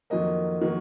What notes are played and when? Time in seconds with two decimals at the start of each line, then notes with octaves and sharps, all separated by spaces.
0.10 F2 D#3 F#3 A#3 D#5
0.61 D#3 F#3 A#3